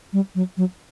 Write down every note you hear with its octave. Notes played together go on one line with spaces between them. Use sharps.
G3
F#3
F#3